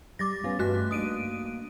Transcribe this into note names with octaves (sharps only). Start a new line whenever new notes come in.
G3 D6 A6 A#6
B3 C#4 F4
E2 G2 A3 F#4 F#6
A#3 D4 D#4 D#6 D7 D#7